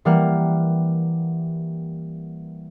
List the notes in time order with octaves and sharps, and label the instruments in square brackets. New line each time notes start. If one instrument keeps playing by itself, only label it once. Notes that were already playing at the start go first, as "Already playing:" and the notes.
[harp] E3 G3 A#3 F#5 F6